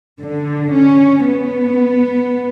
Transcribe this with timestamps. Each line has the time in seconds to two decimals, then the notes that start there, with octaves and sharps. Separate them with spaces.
0.22 D3
0.74 C#4
1.27 B3